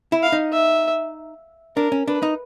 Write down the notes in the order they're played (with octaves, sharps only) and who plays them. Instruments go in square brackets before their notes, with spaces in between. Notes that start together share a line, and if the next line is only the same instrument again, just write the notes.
[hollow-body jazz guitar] E4
[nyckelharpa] F5
[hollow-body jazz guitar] D#4
[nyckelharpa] E5
[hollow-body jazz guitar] D4 [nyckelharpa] A#4
[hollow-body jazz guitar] C#4
[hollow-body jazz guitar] D4 [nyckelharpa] B4
[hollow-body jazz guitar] D#4